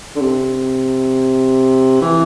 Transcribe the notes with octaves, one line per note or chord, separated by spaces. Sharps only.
D3
C3
E3